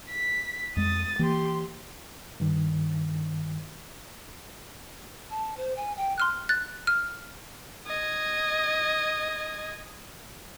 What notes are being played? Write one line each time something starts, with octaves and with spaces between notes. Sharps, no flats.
B6
F2 G#3 D#6 A6
E3 A#3 G4 C6
G2 D#3
A5
C5
G#5
G5
C6 F6 F#6
F#6 A6
F6
D#5 G#6